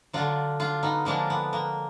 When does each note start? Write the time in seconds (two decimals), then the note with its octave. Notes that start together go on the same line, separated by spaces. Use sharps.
0.13 D3 F#3 D4 F4
0.60 D4 F4
0.83 B3 D#4
1.05 D3 F3 G#3 A#3 D4
1.30 B3
1.53 A#3